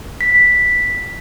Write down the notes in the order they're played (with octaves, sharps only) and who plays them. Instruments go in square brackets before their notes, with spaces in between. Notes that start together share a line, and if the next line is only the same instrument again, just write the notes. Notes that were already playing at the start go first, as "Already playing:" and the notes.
[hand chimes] B6